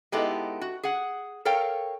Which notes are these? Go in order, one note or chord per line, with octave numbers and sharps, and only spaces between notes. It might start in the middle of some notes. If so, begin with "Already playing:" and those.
G#3 B3 D#4 E4 G4 A4
F#4
G#4 F#5
A4 A#4 C#5 F5 G5